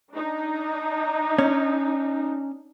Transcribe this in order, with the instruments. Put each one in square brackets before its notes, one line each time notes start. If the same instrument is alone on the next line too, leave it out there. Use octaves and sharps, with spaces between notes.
[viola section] D4 D#4
[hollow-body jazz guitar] C#4